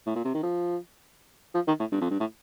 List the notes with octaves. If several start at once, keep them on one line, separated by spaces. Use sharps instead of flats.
A2
A#2
C3
D#3
F3
F3
D#3
A2
G2
F2
G2
A2